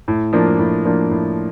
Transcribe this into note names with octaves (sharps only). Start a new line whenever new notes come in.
A2
F3 A#3 D4
A2
F3 A#3 D4
A2